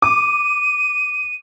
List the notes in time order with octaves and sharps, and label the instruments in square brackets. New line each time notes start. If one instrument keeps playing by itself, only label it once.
[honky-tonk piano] D6 [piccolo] D#7